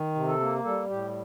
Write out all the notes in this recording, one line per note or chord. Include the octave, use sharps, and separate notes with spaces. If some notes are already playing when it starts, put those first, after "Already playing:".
Already playing: D#3
C3
A4
A#3
G3 A4
A2 G4